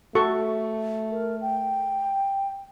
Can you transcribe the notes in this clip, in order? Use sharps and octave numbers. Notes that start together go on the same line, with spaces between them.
A3 F#4 A4 C#6
A#4
G5